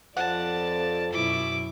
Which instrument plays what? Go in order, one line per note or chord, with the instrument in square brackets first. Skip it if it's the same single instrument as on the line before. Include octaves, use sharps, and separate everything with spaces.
[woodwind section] F2 [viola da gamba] F3 D5 [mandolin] F#5 [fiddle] A5
[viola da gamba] F#2 B2 E4 [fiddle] D6